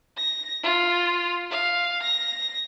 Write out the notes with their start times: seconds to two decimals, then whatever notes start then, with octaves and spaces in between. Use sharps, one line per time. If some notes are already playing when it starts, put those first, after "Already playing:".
0.17 A#6
0.63 F4
1.51 F5
2.03 A#6